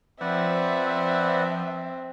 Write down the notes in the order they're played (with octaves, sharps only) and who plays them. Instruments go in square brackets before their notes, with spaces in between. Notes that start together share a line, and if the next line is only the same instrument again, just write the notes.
[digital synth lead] F3 [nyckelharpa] C4 [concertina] B4 D5 F#5 [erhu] E5